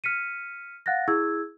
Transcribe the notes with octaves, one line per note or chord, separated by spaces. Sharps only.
F6 B6 C#7 D#7
F5 F#5 F#6 A6 A#6
E4 G#4 E6 G#6